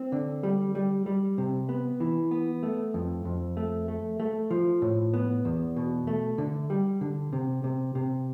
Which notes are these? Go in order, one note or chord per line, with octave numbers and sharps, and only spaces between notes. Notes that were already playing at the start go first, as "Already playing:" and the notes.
Already playing: C4
D3
G3
G3
G3
C3
B3
E3
B3
A3
F2
F2
A3
A3
A3
F3
A2
B3
E2
B2
A3
D3
G3
D3
C3
C3
C3